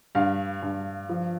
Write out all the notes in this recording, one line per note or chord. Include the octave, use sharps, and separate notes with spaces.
G2 F5
G2
F3